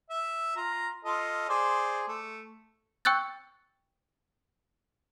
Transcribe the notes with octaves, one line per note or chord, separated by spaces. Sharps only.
E5
F4 A#5
F4 A4 D#5
G#4 C5 D5
A3
G5 C#6 E6 F#6 G6 A6